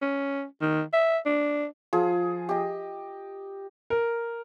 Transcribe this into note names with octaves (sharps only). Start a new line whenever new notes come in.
C#4
D#3
E5
D4
F3 G#4
G4 D#5
A#4